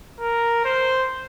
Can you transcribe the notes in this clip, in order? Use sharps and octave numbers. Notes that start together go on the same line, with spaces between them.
A#4
C5